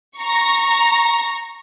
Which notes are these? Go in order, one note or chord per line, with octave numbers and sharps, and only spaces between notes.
A#5 C#6